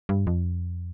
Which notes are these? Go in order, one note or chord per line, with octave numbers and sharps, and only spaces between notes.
G2
F2